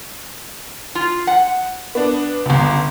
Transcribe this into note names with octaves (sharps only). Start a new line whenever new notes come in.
F4
F#5
B3 D4
G1 C#2